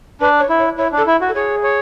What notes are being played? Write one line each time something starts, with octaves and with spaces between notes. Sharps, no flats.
D4 B4
C#5
E4
C#5
E4 C#5
D4
A4
E4
F#4
A4
G#4 C#5
C#5